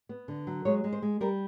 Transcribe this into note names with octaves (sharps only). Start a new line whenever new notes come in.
B3
D3
F#3
G#3 C#5
G#3
C5
G#3
G3 A#4